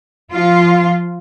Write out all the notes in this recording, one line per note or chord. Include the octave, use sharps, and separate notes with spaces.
F3 F4